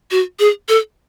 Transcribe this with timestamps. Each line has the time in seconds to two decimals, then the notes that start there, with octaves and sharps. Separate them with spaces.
0.11 F#4
0.39 G#4
0.69 A4